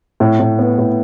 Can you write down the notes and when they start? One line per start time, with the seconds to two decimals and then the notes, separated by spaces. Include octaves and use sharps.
0.20 A2
0.40 A2
0.59 B3
0.78 A2